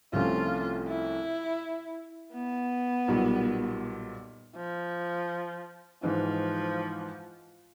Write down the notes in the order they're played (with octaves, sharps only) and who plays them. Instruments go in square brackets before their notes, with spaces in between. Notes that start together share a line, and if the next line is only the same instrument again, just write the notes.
[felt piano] C2 C3 F3 A3 C#4 [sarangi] F4
[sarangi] E4
B3
[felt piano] B1 A#2 G3
[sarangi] F3
[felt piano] G#2 E3 G#3 [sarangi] F3